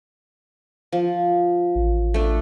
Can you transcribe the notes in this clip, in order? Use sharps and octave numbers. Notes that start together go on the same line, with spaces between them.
F3
A1
A3 D4